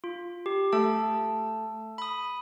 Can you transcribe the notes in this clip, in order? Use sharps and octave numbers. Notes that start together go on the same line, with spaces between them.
F4
G4
A3 A4 A5
B5 D#6